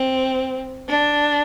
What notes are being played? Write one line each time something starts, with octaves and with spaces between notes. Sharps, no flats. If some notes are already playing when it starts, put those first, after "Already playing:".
Already playing: C4
D4